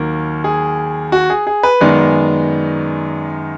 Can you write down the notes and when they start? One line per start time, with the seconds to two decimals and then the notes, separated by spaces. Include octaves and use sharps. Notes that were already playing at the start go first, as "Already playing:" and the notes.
Already playing: D#2 D#3 F#3 A#3 A#4
0.44 G#4
1.12 F#4
1.30 G#4
1.47 G#4
1.63 B4
1.81 F#2 D#3 G#3 B3 D5